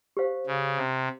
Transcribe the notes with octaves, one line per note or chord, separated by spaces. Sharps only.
G4 C5 F5
C#3
C3